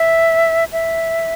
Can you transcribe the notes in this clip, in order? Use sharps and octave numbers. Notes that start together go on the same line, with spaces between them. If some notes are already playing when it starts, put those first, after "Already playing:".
Already playing: E5
E5